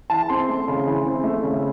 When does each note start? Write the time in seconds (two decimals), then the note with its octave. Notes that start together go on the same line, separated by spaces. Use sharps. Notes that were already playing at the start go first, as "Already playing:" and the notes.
0.10 E3 A5
0.29 C4 C6
0.49 A3
0.68 C#3
0.86 E3
1.05 C4
1.24 A3
1.43 C#3